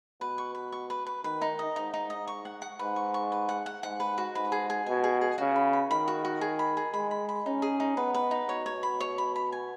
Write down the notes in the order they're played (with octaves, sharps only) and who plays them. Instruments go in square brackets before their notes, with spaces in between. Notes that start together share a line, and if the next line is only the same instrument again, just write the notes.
[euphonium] B2 [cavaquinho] B4
[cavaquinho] C#6
B4
C#6
B4
B4
[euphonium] D#3 [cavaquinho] B4
[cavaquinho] D#4
D#5
[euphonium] G#2 [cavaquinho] D#4
[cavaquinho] D#4
D#5
C#6
F#5
F#5
[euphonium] G#2 [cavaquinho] B4
[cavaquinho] C#6
C#6
B4
F#5
F#5
[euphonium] G#2 [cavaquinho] F#5
[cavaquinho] B4
F#4
[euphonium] G#2 [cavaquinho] B4
[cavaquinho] G#4
G#4
[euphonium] B2 [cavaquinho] G#5
[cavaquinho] G#4
G#4
[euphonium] C#3 [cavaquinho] F#4
[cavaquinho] B5
B5
[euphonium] D#3 [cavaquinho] B5
[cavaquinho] F#4
F#4
G#4
B5
G#4
[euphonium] G#3 [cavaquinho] B5
[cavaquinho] B5
B5
[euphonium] C#4 [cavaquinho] D#4
[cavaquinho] G#4
D#4
[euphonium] B3 [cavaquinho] B4
[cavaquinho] B4
D#4
[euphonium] B2 [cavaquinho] C#5
[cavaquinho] C#5
B5
C#5
B5
B5
G#5